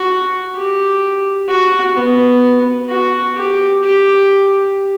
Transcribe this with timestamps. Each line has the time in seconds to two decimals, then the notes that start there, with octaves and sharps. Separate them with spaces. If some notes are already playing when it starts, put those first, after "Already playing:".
Already playing: F#4
0.55 G4
1.49 F#4
1.95 B3
2.89 F#4
3.36 G4
3.83 G4